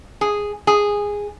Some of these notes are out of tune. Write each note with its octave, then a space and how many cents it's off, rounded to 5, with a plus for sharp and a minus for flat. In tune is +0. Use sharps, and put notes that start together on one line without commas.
G#4 -5
G#4 -10